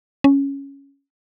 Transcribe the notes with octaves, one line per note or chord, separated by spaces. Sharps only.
C#4